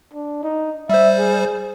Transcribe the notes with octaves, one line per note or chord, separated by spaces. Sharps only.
D4
D#4
G3 C5 E5
G#4